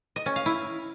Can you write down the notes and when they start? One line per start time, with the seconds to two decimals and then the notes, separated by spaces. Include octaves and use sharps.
0.16 D#5
0.26 C#4
0.36 F5
0.46 E4